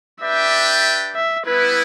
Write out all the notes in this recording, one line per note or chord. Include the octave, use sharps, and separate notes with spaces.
D4 G4 B4 D5 E5 G5
E5
G3 B3 E4 B4